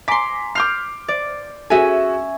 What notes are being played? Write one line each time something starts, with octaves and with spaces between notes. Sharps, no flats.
G#5 A#5 C6 D6 B6
D6 F6 G6 C7
D5
C#4 F#4 G#4 A4 E5 G#5